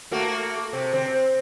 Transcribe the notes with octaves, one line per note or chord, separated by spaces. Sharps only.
A3 A#3 F#4
C3
C4